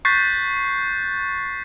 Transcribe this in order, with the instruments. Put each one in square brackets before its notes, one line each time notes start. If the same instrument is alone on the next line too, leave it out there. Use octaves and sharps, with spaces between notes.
[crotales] C#6 F#6 G6 A6 B6 C7